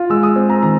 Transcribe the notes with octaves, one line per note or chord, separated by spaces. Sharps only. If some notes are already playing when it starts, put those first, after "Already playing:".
Already playing: F4
G#3 E6
D#6
C4
A#5
D#3 A#5